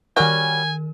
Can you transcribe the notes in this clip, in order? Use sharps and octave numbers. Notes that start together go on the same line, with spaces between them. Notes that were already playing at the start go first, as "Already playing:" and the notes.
D#3 G3 C#4 F#4 A#4 G#5